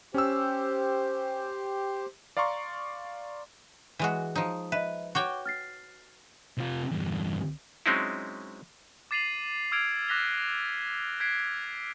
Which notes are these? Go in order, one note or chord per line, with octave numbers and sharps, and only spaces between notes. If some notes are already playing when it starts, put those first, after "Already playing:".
C#4 G4 C5 E6
D5 F5 A#5 C6 C#6
E3 G#3 F#4
F3 D#4 D#6
B4 D#5 E5
F#4 C#5 G5 C#6 D6
F6 A6 C7
C3 F4
E2 G2
F#3 G#3 C4 C#4 D#4 E4
D6 A6 C7 D#7 F7 F#7
D6 E6 F6 G#6 D7 F7
D6 F#6 A#6 B6 F7 G7
F#6 G#6 B6 C7 D7